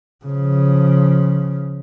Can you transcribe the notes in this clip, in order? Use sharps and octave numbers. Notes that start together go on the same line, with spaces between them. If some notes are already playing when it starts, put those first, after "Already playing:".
C#3 F3